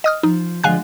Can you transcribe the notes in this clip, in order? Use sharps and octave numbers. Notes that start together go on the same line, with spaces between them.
D#5 D#6 F6
F3 D#4
D3 F3 G#3 F5 G#5 F#6